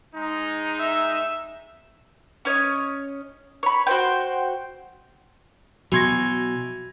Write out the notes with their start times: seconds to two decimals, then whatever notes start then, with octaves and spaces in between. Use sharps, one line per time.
0.15 G#3 D#4
0.79 E5
2.45 C#4 C#5 D#5
3.63 C#5 B5
3.87 F#4 C5 G5
5.92 B2 E3 F#3 F#4 C6 C#6 G#6 A#6